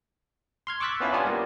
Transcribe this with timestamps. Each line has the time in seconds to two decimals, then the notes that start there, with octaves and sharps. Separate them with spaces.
0.67 C6 F6 G#6
0.80 C#6 D6 E6 F#6 A6 B6
1.00 B3 C#4 E4 F4 F5 A5
1.12 B3 C#4 D4 F4 G4 G#5
1.25 G3 A#3 B3